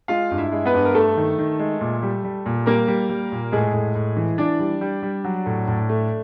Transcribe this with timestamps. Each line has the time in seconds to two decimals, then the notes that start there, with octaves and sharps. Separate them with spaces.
0.08 G#3 F4 F5
0.31 G2
0.38 E4 E5
0.52 G#3
0.65 B3 B4
0.74 G2
0.85 A#4
0.94 G2 A3 A4
1.17 D#3
1.38 D#3
1.60 G#3
1.81 A#2
2.03 G3
2.24 G3
2.46 A#2
2.66 G3 A#3 A#4
2.88 G3
3.09 G3
3.32 A#2
3.52 A2 G#3 G#4
3.74 A2
3.95 A2
4.17 E3
4.38 E3 D4 D5
4.59 G3
4.81 G3
5.03 G3
5.24 F#3
5.46 A2
5.68 A2
5.89 A3